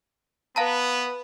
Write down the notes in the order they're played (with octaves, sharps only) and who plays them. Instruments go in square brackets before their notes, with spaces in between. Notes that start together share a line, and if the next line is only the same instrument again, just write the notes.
[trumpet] B3 [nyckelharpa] B4 [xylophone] F5 A5 A#5